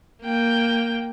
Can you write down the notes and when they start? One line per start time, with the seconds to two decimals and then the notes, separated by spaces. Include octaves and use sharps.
0.22 A#3 G5